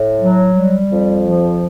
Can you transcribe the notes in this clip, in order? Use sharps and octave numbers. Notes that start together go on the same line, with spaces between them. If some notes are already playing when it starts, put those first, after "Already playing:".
Already playing: A2
F#3
G3
F2
F3